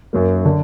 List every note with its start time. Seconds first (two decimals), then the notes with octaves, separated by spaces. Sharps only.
0.13 F#2 F#3 A#3
0.45 D3